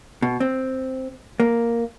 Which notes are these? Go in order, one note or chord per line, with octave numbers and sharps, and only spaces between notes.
B2
C4
A#3